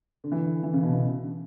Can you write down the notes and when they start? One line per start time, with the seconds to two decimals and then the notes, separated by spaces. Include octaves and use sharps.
0.24 D3
0.32 E3
0.40 D3
0.63 E3
0.73 C#3
0.83 B2
0.93 B2